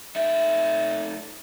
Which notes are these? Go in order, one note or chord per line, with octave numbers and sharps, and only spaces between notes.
A3 D#4 E5